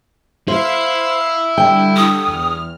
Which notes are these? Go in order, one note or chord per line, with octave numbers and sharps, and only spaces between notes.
E4 C5 F5 C7
D3 G3 G5
D#6
E2 F6